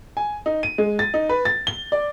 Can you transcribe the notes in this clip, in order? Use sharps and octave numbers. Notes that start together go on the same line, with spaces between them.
G#5
D#4
D#7
G#3
A6
D#4
B4
A6
G7
D5